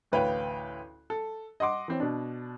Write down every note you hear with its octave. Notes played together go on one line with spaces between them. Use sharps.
A1 D2 B4 C#5 F5 G5
A4
D#5 F#5 C6 D6
E3 C4 C#4
B2 D4